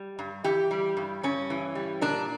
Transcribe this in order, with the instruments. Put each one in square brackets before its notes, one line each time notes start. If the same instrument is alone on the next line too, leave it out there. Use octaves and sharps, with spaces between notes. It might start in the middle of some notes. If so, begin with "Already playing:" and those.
Already playing: [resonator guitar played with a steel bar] G3
G2
E3 G4
G3
G2
G2 C#4
E3
G3
A#2 D4